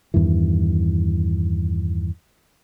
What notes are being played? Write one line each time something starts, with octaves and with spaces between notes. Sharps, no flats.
E2 G2 D#3 E3